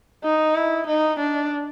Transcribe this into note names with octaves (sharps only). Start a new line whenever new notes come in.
D#4
E4
D#4
D4